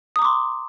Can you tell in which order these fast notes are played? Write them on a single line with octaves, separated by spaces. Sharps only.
D#6 A#5 D6 C6